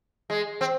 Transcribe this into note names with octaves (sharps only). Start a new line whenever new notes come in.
G#3
C4